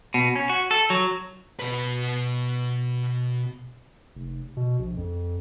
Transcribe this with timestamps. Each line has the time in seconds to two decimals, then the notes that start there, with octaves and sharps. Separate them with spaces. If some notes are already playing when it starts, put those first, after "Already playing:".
0.14 B2
0.36 C#4
0.49 F#4
0.71 A4
0.90 F#3
1.59 B2 B4
4.15 F1
4.57 B2
4.79 A#1
4.97 F2